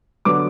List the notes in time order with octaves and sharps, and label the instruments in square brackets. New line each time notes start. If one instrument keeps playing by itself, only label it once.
[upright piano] D3 F#3 B3 D4 D6